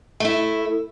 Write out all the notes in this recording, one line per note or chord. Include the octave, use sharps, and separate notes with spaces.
A3 E4